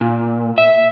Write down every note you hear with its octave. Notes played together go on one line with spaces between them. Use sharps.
A#2
E5